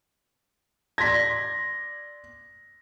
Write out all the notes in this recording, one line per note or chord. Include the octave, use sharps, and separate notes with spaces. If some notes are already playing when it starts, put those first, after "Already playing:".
D5 C6 G#6 A#6 B6